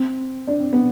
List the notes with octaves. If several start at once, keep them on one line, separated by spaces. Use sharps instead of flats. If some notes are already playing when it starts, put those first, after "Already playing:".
Already playing: C4
D4
C4
B3